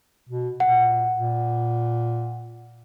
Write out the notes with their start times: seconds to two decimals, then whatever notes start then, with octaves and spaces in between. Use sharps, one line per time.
0.29 B2
0.60 A#2 F#5
1.14 A#2